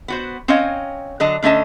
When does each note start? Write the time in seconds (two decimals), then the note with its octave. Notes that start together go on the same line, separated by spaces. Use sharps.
0.08 B3 F#4 C5
0.48 C4 C#4 C#5 D#5 F5 G5
1.20 D3 F#3 D4 D#5 A5
1.42 D3 A3 C#4 D#5 A5